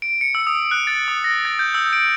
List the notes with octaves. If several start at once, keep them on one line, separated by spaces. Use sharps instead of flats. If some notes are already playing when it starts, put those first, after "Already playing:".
D7
C#7
E6
D#6
F#6
A6
D#6
A#6
A6
G6
E6
D7